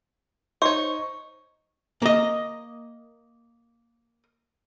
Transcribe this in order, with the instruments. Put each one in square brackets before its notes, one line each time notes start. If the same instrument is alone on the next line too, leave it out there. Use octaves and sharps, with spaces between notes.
[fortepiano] D#4 [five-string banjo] C5 C#5 [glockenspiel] C#6
[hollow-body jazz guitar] A#3 D#5